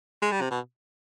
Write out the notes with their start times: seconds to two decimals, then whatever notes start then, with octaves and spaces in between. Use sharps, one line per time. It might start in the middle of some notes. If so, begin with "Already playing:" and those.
0.22 G#3
0.31 G3
0.41 C3
0.51 B2